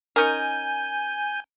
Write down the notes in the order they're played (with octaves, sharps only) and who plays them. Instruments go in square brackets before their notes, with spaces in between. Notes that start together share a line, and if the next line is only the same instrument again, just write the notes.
[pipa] C#4 D#4 A#4 [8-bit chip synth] G#5 G6